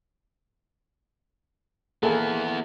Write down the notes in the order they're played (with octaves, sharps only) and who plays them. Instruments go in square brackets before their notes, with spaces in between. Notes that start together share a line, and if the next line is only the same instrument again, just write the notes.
[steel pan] A#3 G#4 A4 [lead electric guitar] B3 E4